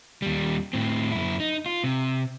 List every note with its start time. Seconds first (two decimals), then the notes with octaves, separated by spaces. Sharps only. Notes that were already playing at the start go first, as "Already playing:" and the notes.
0.22 D#2 G3
0.73 A2 C4
1.12 F#2 E4
1.40 D#4
1.66 F4
1.84 C3